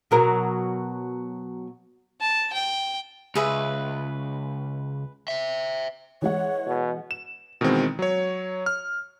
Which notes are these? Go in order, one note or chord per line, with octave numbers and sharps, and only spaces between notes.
B2 F#3 A#4
A5
G5
C#2 G#4 B4 E5
C5 E5
E3 G#3 C#5 F#5
B2
E7
B2 D#3 E3 G#3 C4
F#3 C#5
F6